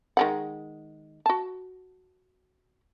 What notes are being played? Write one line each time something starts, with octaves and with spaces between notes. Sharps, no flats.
D#3 G#3 F#5
F#4 A5